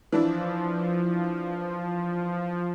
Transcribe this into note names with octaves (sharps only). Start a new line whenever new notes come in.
E3 F3 D4 E4